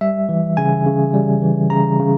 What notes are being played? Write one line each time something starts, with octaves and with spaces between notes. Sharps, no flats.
G3 E5
E3
C#3 G#5
C#3
G3
E3
C#3 A#5
C#3